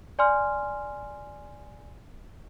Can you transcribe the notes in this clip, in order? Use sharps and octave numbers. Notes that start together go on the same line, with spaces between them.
D5 G#5 C6 F6